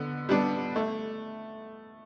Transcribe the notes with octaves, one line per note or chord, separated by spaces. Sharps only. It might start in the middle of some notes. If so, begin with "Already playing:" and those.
Already playing: D3 B3
G3 B3 D4
A3